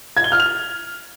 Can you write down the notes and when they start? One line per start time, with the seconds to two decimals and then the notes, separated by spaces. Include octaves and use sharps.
0.17 G#6
0.24 G7
0.32 F6
0.40 F7